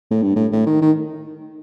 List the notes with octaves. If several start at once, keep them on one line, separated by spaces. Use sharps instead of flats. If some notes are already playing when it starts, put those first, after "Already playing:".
A2
G2
A2
A2
D#3
D#3